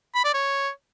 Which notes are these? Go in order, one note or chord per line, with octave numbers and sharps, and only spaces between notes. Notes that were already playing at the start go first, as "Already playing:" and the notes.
B5
D5
C#5